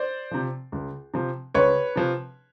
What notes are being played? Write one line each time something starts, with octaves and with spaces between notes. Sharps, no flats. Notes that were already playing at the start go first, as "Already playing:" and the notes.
Already playing: C5 D5
C3 F3
C#2
C3 F3
C#2 B4 C#5
C3 F3